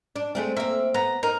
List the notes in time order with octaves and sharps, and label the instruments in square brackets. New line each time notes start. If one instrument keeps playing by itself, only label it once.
[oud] D4
G#3 A3 C4
[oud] A#3 C4 [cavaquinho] E5
[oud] B3 [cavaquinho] A#5
[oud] D#4 [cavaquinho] A#4